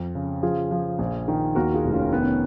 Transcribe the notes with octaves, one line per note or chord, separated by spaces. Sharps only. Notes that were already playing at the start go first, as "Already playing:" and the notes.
Already playing: F2
C#3
F3 F4 G#4
F3
A#1
D#3
D#2 F#4 A#4
F4 G#4
F1
C#4 F4
D#3 B3
C#4